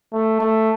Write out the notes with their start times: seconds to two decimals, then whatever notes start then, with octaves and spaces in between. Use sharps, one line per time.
0.13 A3
0.40 A3